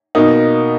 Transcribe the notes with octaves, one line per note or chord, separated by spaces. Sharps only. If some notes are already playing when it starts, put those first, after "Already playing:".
B2 A#3 D#4